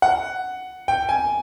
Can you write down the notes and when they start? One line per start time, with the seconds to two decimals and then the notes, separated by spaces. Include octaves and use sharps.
0.02 F#5
0.88 G5
1.09 G#5